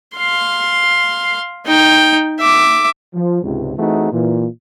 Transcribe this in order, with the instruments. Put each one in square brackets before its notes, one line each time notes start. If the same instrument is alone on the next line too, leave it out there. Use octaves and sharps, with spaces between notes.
[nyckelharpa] F5 C6
D#4 G5
E5 D6
[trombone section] F3
C#2 G#2 C3
E3 A3 C4 D#4 F#4 G#4
A#2 E3